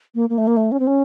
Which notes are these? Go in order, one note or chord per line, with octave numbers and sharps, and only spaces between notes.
A#3
A#3
A3
A#3
A3
C#4
C4
C#4